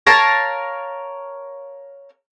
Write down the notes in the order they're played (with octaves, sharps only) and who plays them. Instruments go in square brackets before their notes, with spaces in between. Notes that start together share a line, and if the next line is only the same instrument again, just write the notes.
[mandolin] A#4 C#5 F5 A5